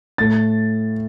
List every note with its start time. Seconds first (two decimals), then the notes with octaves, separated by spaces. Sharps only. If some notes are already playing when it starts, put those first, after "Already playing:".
0.18 A2 A3 A6